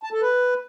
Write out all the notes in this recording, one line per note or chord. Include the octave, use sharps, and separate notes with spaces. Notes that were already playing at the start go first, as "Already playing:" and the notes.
A5
A4
B4